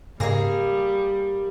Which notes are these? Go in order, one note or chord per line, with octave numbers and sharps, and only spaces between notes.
G#2 C#3 G3 A#3 G#4 A#6